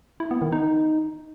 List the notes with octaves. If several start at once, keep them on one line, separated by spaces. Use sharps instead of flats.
E4
B3
D#3
D#4